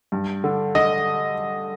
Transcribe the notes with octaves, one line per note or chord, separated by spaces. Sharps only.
G2
D3
D3 D#5